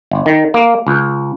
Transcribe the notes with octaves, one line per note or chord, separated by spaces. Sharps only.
G1
D#3
A#3
C#2